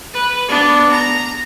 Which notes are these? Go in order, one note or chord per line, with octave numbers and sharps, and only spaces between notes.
B4
B3 D4
A#5